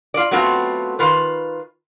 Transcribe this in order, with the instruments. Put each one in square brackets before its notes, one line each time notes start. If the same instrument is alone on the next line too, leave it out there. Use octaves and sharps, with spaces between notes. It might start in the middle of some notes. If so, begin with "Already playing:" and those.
[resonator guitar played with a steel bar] F4 D5
F#3 A3 B3 C4 F4
D#3 F4 B4